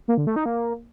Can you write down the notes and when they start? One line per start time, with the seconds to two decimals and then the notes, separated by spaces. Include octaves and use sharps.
0.08 A#3
0.17 D3
0.27 A3
0.36 D#4
0.46 A#3